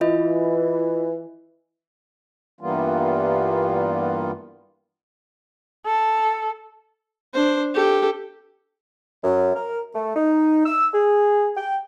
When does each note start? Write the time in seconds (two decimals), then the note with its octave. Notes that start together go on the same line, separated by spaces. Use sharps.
0.01 E3 F4 D#5
2.61 G2 E3 G3 A#3 B3 F4
5.86 A4
7.34 D4 C5
7.75 G4 A4
9.24 F#2
9.55 A#4
9.94 A3
10.15 D#4
10.66 E6
10.93 G#4
11.56 G5